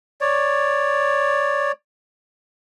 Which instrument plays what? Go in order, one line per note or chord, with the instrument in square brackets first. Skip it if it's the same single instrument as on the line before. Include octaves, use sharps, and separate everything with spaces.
[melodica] C#5 D5